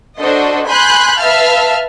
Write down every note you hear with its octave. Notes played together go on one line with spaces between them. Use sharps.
D4 F#4 A4 C5 D#5
G#5 B5 C6 F#6 G6
B4 E5 F5 A5 F6